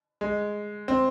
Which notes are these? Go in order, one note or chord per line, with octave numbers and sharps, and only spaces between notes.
G#3
C4